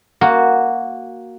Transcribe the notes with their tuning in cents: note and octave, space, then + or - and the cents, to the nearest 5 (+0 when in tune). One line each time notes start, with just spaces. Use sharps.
A#3 +0 F#4 +0